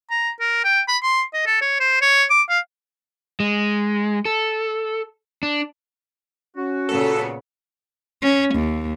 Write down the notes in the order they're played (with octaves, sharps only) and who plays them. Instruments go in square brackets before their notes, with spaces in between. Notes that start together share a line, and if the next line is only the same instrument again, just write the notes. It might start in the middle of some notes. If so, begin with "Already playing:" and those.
[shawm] A#5
A#4
G5
B5
C6
D#5
A4
C#5
C5
C#5
D6
F5
[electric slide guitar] G#3
A4
D4
[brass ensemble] C#4 [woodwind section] F#4
[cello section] A#2 C#3 B3 [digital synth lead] A4
[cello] C#4
D#2